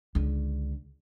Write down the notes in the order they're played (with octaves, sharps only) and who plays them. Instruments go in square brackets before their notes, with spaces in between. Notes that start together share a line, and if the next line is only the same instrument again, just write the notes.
[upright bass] C#2 D3